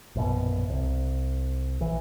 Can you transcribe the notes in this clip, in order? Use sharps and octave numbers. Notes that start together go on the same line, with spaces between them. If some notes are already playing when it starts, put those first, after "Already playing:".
A#1 F#2 B2
C2
A#1 E3